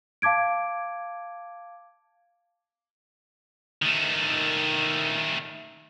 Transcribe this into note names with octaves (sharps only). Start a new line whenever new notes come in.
F5 A5 D6 G#6 D7
D#3 A3